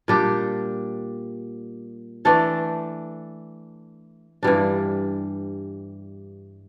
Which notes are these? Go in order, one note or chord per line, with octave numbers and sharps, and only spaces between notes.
A#2 G3 D4 G4
E3 A3 D4 A4
G2 E3 G3 D4